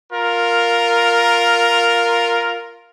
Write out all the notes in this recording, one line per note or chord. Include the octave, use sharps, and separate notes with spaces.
F4 A#4